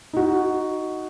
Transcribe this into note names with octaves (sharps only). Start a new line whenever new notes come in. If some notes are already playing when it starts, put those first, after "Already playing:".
D#4 F#4